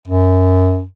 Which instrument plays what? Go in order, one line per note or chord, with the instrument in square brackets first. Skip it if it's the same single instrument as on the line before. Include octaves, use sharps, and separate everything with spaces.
[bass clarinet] F#2